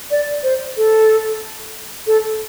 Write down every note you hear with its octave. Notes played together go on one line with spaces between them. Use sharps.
D5
C5
A4
A4